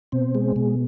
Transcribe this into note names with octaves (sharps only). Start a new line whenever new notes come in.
B2 C4
G#3
B2